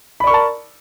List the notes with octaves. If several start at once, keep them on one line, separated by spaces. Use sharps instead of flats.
A#4 D5 A5 B5 C#6